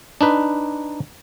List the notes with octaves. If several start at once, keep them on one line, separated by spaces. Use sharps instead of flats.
D4 D#4 B4